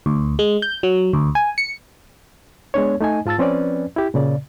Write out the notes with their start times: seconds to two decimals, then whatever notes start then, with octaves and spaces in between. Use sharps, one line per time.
0.06 D2
0.39 G#3
0.62 G6
0.83 F#3
1.13 D2
1.35 G#5
1.58 C#7
2.74 G#3 B3 D4 C#5
3.01 A3 D#4 D#5 G#5
3.25 G#2 F4 A5 E6 A6
3.38 F3 C4 C#4 B4 D5
3.96 E4 G4
4.14 A#2 C#3 D5